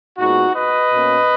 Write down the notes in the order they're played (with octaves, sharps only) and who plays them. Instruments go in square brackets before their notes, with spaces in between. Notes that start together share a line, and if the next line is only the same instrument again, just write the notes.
[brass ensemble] A#2 G#3 B3 D#4 F#4
B4 D#5
B2 A#3 C#4